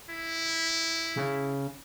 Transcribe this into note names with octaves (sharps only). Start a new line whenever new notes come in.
E4
C#3